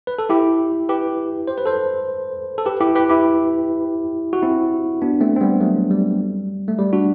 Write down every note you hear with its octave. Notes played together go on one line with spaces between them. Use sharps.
B4
A4
E4 G4
G4 B4
C5
B4
A4 C5
A4
G4 B4
E4 G4
G4 B4
E4 G4
F#4
C4 E4
B3 D4
A3 C4
C4
G3 B3
F#3 A3
G3
A3
G3
D4 F#4